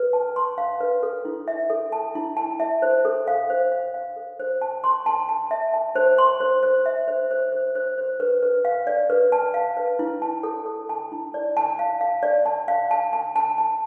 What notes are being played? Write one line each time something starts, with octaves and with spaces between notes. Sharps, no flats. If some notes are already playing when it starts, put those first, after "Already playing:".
Already playing: B4
A5
C6
F5
B4
A4
E4
E5
A4
A5
E4
A5
E5
C5
A4
F5
C5
F5
F5
A4
C5
A5
C6
A5
A5
E5
A5
C5
C6
C5
C5
E5
C5
C5
C5
C5
C5
B4
B4
F5
D5
B4
A5
F5
B4
E4
A5
A4
A4
A5
E4
D5
A5
F5
F5
D5
A5
F5
A5
A5
A5
A5